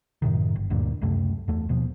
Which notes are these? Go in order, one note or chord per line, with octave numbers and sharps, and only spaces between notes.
F#2 A2 C3 D#3
G1
D2 G2 A#2
C#2 F#2 C3 A3
E2 A3
D#2 B2 F3